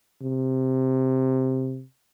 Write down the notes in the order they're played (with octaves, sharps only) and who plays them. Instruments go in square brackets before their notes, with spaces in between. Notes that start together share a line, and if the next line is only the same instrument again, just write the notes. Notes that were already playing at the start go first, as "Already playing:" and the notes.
[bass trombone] C3